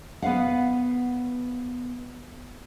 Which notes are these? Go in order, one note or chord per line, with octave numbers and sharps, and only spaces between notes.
B3 B4 F5 F#5